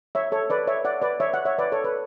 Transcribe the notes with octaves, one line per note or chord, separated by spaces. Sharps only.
C#5 E5
A4 C#5
B4 D5
C#5 E5
D5 F#5
B4 D5
C#5 E5
F#5
C#5 E5
B4 D5
A4 C#5
B4